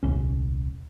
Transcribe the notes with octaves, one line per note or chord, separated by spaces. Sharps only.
D#1 C2 C#4